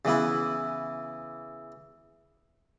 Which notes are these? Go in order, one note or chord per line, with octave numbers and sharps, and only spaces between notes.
C#3 E3 B3 E4